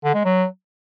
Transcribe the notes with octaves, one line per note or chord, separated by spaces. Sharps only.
D3
G#3
F#3